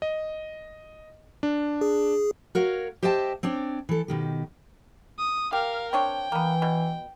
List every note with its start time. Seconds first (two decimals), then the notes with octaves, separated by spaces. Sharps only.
0.02 D#5
1.43 D4
1.81 G#4
2.55 F#4 A#4 C#5 F5
3.03 G4 C5 D#5 E5 G5 A5
3.43 C4 D4 C#5 D5
3.89 E3 A4
4.08 B2 D#3 G4
5.19 D#6
5.53 G4 A#4 F5
5.93 C4 D4 C#5 G5
6.32 E3 A#3 B3
6.62 B2